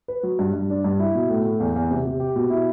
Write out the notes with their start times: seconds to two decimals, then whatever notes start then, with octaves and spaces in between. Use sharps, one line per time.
0.08 B4
0.23 F#3
0.39 G2
0.54 G2
0.70 D4
0.84 G2
1.00 E4
1.15 B2
1.30 A2
1.45 A2
1.60 E2
1.76 E2
1.91 C3
2.05 C3
2.20 G4
2.36 B2
2.50 E4